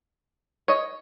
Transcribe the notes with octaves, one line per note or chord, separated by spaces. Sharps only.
C#5 D#5